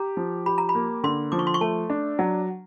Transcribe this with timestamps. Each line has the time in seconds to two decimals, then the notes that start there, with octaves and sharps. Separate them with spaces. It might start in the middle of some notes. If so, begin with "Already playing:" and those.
Already playing: G4 A#5
0.17 F3
0.46 G4 B5
0.58 A#5
0.69 B5
0.75 A#3
1.04 D3 C6
1.32 F3 D6
1.39 C#6
1.47 C6
1.54 C#6
1.61 A3 A5
1.90 D4
2.19 F#3